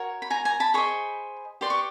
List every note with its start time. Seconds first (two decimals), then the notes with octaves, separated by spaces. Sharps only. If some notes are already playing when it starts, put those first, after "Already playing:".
Already playing: F#4 A#4 C#5
0.22 B5
0.30 G#5 A#5
0.45 G#5 A#5
0.60 A5 B5
0.74 G#4 C5 D#5 B5 C#6
1.61 G4 B4 D5 C6
1.70 C#6